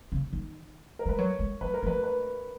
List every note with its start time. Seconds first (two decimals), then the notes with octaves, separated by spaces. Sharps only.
0.12 C#3
0.33 D#3
0.99 A#4
1.06 G#3 B4
1.18 F#3 C#5
1.39 G#3
1.61 F#3 B4
1.74 A#4
1.83 F3
1.87 B4
2.04 B4